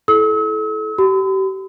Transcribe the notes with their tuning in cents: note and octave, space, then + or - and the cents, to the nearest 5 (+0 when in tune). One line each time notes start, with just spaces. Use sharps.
E4 +0 A4 -30 E6 -45
G4 -35 B5 +45